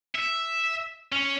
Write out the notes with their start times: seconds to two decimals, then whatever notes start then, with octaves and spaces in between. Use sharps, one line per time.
0.15 E5
1.12 C#4